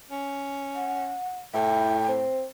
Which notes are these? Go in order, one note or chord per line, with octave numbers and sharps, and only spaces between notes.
C#4
F#5
A2 E4 G5
C4